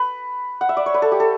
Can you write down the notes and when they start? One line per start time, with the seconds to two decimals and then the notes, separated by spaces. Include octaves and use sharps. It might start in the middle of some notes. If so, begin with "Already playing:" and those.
Already playing: B4
0.61 F#5
0.69 E5
0.77 D5
0.86 C#5
0.94 B4
1.02 A4
1.12 G4
1.20 A4